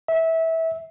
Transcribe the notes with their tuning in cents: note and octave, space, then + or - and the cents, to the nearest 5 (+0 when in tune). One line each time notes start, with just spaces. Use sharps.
E5 -20